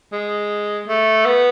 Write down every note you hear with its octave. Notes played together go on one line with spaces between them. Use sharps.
G#3
A3
B3